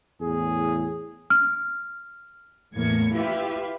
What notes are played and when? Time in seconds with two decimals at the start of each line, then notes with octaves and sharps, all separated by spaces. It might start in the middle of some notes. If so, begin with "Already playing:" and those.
0.21 E2 A2 G#4
1.30 F6
2.75 E2 A2 A#3 G#6 C#7
3.13 E4 F4 G4 B4 E5 F5